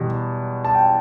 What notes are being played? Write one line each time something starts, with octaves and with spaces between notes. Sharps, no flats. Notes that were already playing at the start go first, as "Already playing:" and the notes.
Already playing: E2 B2 G3
A5
G5